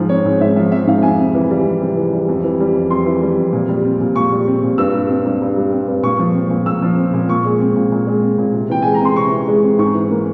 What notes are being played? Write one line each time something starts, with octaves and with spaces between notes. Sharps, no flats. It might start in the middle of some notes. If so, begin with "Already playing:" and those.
Already playing: G#2 F3
C4 C#5
G#2
G#2 E5
F3 E5
C4 E5
G#2 F5
F2 G#5
C3
E3
G3
F2
C3
E3
G3
F2
E3
G3
F2
F2 C6
E3
G3
F2
A#2
G3
C4
A#2
A#2 C#6
G3
C4
A#2
G2 E6
G3
C4
G2
G2
G3
C4
G2
A#2 C#6
F3
C4
A#2
A#2 E6
F3
C4
A#2
A#2 C#6
G#3
C4
A#2
A#2
G#3
C4
A#2
C3
E3 G5
G#3 G#5
A#5
C4 C6
C3 C#6
E3
G#3
C4
G#2 C#6
E3
A#3